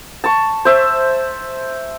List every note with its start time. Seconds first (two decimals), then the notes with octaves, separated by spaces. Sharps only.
0.24 A5 C#6
0.65 C5 E5